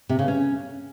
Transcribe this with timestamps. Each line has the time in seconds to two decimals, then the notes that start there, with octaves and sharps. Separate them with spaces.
0.09 C3
0.19 C#3
0.28 C#4